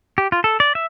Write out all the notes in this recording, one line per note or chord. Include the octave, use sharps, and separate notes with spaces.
G4
F4
A4
D5
E5